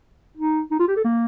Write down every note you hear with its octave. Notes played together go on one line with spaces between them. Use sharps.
D#4
D#4
F4
G4
A4
A#3